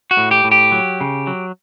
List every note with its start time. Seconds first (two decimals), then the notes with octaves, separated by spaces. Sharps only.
0.11 F#4
0.17 A2
0.31 G4
0.44 A2
0.52 G4
0.72 F#3
1.01 C#3
1.27 F#3